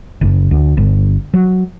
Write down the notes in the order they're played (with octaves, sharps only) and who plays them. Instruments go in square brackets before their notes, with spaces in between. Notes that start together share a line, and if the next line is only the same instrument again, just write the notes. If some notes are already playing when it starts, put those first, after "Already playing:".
[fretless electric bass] F#1
D2
G1
F#3